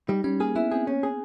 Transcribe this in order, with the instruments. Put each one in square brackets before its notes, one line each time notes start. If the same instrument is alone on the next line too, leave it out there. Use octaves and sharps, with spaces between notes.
[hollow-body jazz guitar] G3 [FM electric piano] D#4
[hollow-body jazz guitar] G3 [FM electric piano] C#4
[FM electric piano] A#3 [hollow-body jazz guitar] G#4
[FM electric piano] B3 [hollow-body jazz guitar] E4
[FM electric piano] C4 [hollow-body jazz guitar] G#4
[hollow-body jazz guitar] C#4
G#4